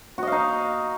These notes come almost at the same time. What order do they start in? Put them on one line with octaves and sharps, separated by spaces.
F#4 D#5 F5 D#4